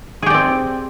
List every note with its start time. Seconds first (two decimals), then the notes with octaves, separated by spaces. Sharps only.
0.22 G#4
0.26 G4
0.30 D5
0.34 C4